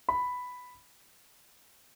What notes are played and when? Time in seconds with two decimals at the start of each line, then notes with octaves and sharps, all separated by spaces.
0.09 B5